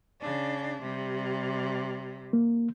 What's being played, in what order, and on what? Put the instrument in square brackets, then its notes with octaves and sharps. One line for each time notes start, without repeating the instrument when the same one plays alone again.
[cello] C#3 D4
C3 G3
[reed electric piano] A#3